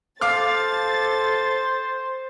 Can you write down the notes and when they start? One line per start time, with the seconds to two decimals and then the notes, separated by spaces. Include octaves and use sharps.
0.21 A4 C5 F5 D6 F6 A6